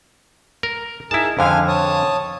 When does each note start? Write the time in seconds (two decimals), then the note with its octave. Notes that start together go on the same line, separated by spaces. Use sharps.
0.63 A#4
1.11 D#4 E4 G#4 A#4 A5
1.39 F2 D3 F5 G#5 F6
1.68 C#5 A5 D#6